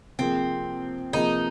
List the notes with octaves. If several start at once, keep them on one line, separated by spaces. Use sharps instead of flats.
C3 F3 A#3 C4 G#4
C3 F3 A#3 D#4 G#4